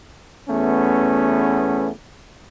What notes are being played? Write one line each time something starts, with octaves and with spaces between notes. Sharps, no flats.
E2 A3 B3 C#4